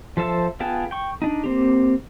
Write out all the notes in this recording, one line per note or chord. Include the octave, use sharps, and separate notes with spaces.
F3 A4 C5 E5 A5
B3 F4 G#4 G5 A5
G5 C#6
D4 D#4
A#3 C4 G4